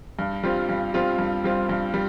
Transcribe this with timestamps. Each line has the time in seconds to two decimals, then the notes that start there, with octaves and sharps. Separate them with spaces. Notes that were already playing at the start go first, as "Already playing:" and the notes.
0.19 G2
0.43 G3 C4 F4
0.69 G2
0.94 G3 C4 F4
1.18 G2
1.44 G3 C4 F4
1.69 G2
1.94 G3